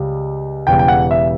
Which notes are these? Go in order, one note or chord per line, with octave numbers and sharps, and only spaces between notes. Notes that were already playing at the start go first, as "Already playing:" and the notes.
Already playing: C#2 C#3 G3
E1 E2 C#3 G3 G5
G5
F#5
E5